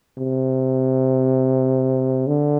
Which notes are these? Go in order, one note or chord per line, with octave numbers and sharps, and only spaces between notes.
C3
D3